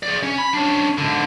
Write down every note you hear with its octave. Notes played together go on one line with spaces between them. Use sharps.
G#4 D5
C#4
B5
C#4 D4
G#2 D3